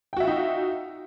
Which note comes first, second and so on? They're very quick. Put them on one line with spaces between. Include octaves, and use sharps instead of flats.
G5 F#4 E5 F4 D#4